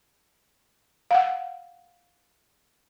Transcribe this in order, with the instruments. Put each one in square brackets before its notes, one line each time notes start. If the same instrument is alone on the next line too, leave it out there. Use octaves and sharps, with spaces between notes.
[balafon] F5 F#5